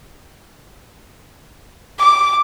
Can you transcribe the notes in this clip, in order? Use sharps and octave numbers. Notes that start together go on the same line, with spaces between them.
D6